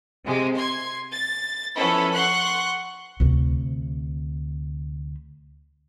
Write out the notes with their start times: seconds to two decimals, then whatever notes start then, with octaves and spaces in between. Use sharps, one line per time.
0.25 C3 G#3
0.57 C6 G#6
1.13 A6
1.76 F3 B3 C#4 E4 A4
2.14 F#5 C6 C#6 F#6
3.20 D2 C3